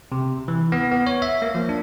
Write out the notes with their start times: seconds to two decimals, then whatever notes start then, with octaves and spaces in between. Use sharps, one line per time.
0.12 C3
0.48 E3
0.72 B3
0.92 B3
1.07 C#5
1.22 E5
1.42 A#3
1.55 F3
1.69 D4